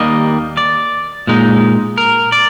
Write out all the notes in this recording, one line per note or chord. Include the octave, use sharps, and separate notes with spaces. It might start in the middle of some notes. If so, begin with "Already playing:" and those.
Already playing: D#2 D#3 G3 A#3 D#5
D5
A#2 G#3 D#4
A#4
D5